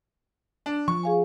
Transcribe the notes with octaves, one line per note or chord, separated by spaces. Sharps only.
D4
F3 C#6
G#4 F5 G#5